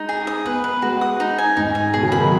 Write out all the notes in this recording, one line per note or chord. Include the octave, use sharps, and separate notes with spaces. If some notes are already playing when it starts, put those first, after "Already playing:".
Already playing: G#3 D#4
G#4
D#6
B3 B4
B4
G#3 F#4
D#6
D#4
G#5
G#2 D#4
G#5
B2 G#4
C#3
D#3 B5
F#3